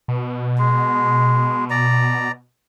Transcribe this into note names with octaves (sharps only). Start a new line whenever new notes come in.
B2
G#3
D5 A#5